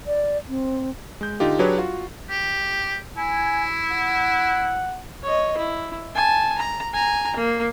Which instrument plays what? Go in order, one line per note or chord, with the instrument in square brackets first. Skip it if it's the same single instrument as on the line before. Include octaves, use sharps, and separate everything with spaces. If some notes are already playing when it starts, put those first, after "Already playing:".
[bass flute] D5
C4
[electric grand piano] G#3 G6
D3 D#4 F4 G4
F#3 D4 G4 G#4 B4 C#5
F4 F#4
[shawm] G4
[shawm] E4 [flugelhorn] G#5
[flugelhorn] F#5
[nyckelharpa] C#5 D#5
E4
G#5 A5
A#5
G#5 A#5
A#3